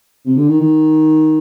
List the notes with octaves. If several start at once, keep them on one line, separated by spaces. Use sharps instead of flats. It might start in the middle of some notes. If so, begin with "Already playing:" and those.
C3
D3
D#3
D#3